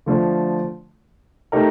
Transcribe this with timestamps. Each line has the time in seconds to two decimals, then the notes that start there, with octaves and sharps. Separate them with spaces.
0.06 D3 F3 A3 D4
1.52 A3 D#4 G4 A#4